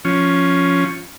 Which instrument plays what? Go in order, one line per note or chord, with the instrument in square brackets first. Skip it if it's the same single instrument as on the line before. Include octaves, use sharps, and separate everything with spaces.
[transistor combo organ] F3 C#4